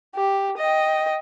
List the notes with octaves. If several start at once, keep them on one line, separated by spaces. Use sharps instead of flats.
G4
D#5 G5